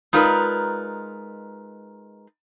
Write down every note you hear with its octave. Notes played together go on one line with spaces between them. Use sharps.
G#3 D#4 F4 A#4 B4 D5